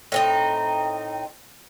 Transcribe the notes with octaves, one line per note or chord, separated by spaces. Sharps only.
A2 C4 D#4